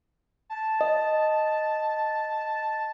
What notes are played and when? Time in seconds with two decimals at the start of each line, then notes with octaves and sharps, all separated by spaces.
0.50 A5
0.81 D#5